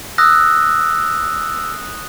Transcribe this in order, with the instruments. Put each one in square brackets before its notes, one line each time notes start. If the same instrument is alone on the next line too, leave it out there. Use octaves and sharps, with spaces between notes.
[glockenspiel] D#6 F#6 A#6 [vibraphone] E6